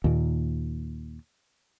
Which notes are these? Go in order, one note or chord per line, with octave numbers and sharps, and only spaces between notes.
D#2 A#2